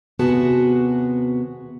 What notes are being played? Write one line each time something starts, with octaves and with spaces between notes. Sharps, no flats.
D#2 C3 B3 F#4 G#4 A5